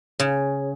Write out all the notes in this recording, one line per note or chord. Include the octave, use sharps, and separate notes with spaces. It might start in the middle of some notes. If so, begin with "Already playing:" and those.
C#3